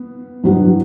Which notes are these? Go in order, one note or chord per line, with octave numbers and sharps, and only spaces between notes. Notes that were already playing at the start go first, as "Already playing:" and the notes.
Already playing: B3
G2 F#3 B3 F#4